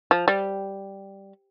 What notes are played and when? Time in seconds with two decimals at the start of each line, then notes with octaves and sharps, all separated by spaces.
0.11 F3
0.28 G3